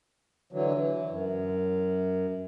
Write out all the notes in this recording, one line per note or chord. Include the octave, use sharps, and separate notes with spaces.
D3 E3 F#3
E3
F#2